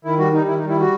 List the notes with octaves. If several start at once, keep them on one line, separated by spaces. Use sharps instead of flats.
D#3 E4
G3 F#4
G3 D#4
D#3 E4
D#4
G3
E4
F#4